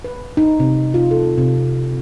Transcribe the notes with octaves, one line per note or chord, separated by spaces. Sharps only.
B4
D#4
C3
F4
A4
C3